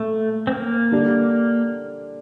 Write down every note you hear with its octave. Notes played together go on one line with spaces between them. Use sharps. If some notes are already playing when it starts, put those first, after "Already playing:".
Already playing: A#2 A3
C4
A#3
D3 G3 D4